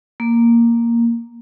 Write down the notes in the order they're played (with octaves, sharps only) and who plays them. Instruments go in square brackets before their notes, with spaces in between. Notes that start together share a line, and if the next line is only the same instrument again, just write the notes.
[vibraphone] A#3